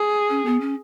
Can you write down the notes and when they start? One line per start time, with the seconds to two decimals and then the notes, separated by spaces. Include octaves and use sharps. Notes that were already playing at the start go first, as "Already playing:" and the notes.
Already playing: G#4
0.30 C#4
0.45 B3
0.60 C#4